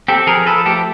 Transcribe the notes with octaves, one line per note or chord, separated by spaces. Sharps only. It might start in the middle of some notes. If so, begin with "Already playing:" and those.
C4 G4 A4
F3 G#4 A#4
F3 A4 B4
A3 G4 A4